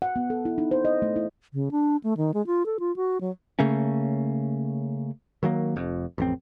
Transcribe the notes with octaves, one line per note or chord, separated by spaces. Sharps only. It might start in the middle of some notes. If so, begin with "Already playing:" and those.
F#5
B3
A4
E4
D#4
C5
D#5
A3
E4
C#3
D4
A3
D#3
G#3
F4
A4
F4
F#4
F#3
C#3 A3 A#3 C#4
D#3 F#3 A3 A#3
F1 F2
A1 F2 C4